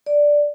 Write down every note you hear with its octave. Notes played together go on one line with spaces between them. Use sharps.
D5